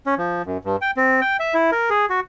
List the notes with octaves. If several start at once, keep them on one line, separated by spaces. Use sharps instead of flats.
C#4
F3
F#2
G2
G5
C4
G5
E5
E4
A#4
G#4
F#4